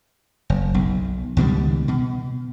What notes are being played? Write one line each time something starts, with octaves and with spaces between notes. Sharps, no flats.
F#1
B1
C#2 B2 D#3 G3
B2